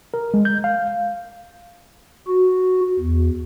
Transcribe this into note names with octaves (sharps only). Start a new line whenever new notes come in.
A#4
G#3
G6
F5
F#4
E2